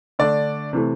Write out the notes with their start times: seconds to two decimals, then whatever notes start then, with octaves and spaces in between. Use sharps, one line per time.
0.19 D3 A3 D4 D5
0.73 C3 E3 A3